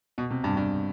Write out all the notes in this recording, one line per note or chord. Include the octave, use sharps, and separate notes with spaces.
B2
C3
G2
G2